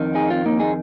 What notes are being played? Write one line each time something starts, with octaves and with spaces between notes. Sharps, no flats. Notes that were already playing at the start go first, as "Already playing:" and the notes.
Already playing: F2 D#3
D#4 G#4
C4 F4
A#3 D#4
D#4 G#4